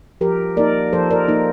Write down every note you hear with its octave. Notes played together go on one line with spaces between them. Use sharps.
F3 G4 A#4
A#3 D#4 A#4 D5
F3 A4 C5
A#4 D5
A#3 D#4